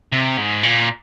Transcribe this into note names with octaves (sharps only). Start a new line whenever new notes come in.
C3
G#2
A#2